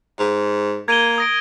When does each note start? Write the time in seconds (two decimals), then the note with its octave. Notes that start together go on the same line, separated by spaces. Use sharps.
0.19 G#2
0.88 A#3 G#6 D#7 G7
1.18 D#6 A#6 D7